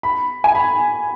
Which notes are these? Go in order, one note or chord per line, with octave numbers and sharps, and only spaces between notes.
B5
G#5
B5